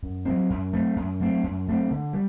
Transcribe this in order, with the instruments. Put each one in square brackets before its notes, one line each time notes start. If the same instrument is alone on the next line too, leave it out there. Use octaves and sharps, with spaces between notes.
[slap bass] F#2
F#3 A3 C4
F#2
F#3 A3 C4
F#2
F#3 A3 C4
F#2
F#3 A3 C4
D3
G3